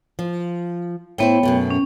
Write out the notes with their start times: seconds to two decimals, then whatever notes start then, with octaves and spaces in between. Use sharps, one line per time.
0.19 F3
1.18 A2 B3 E4 C5 C#5 G5
1.43 F#2 B2 A3
1.71 C#4